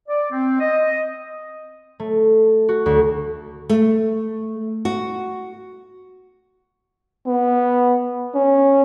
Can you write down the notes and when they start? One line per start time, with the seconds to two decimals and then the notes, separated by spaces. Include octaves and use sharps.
0.08 D5
0.32 C4
0.60 D#5
2.00 A3
2.69 F#4
2.86 D2
3.69 A3
4.85 F#4
7.26 B3
8.35 C#4